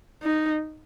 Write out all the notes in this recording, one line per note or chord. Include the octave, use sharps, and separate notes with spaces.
D#4